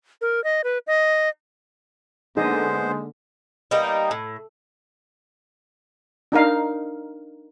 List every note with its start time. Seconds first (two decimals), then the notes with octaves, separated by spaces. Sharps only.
0.21 A#4
0.44 D#5
0.64 B4
0.87 D#5
2.37 D3 G#3 A#3 B3 D#4 G#4 C5 D#5
3.71 G3 A#3 B3 D#4
4.11 A2
6.32 D4 D#4 A#4 F5